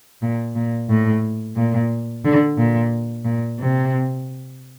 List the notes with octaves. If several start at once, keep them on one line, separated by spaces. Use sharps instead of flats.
A#2
A#2
A2
A#2
D3
A#2
A#2
C3